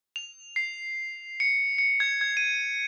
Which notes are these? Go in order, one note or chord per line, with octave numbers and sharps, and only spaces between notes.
F7
C7
C#7
C#7
G#6
G#6
D#7